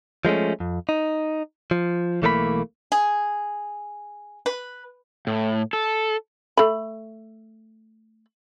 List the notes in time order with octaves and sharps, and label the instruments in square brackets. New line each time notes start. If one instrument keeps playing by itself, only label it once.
[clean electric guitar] F3 G#3 A3 C#4
F2
D#4
F3
B1 E3 A3 A#3 B4 B5
[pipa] G#4
B4
[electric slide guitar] A2
A4
[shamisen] A3 B5